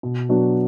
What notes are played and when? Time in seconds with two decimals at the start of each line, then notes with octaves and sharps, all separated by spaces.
0.03 B2
0.29 F#3 B3 D4 F#4